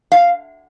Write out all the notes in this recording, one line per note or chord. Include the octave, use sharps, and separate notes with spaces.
F5